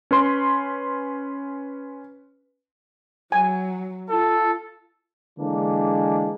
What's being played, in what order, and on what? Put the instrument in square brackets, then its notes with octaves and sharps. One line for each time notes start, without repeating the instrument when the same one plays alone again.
[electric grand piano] C#4 B4 C6
[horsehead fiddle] F#3 [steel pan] G#5
[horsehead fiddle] F4 [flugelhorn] A4
[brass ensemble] D3 E3 G#3 A#3 D4